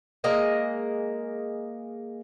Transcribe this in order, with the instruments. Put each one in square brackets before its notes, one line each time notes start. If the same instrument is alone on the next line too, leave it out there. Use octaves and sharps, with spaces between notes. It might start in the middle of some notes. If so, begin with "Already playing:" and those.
[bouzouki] G#3 A#3 A#4 D#5